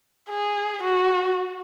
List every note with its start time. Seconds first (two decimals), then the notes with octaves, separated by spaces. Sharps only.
0.29 G#4
0.83 F#4